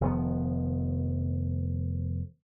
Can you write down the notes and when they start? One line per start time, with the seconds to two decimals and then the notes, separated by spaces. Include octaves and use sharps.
0.01 F1 D#3 F3 B3